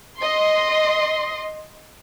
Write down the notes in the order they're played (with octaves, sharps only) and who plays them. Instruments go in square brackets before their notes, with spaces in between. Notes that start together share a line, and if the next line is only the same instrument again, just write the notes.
[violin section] D#5 C6